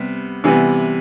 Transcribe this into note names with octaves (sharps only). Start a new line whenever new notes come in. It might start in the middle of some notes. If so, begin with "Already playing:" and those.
Already playing: C3 G3 B3
C3 E3 G3 B3